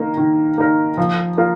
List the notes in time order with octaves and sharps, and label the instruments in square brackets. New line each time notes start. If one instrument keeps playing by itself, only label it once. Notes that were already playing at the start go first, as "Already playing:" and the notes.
Already playing: [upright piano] D#3 A#3 D#4 A#4
D#3
A#3 D#4 A#4
F3
A#3 F4 A#4